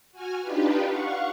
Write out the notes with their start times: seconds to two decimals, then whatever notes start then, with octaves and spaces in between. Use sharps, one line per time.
0.12 F#4 G#5 F6
0.42 D4 D#4 F4 G4 B4
0.87 F5 F#5 C#6